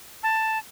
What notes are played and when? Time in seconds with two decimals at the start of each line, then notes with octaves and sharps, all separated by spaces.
0.23 A5